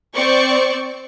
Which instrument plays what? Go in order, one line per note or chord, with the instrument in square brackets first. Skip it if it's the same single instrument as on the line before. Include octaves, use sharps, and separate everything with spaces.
[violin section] C4 C5 D5 C#6